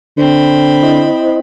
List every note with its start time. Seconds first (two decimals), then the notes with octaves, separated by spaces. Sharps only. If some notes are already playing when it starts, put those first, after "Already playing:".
0.18 D3 C4 B5
0.83 E4 C5 D#5